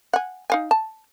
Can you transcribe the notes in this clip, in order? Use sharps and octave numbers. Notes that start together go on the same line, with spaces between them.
F#5 G#5
D#4 F5 G#5
A5